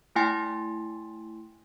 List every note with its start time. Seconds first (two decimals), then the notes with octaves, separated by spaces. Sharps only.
0.16 A3 E4 G5 G#5 C6 A6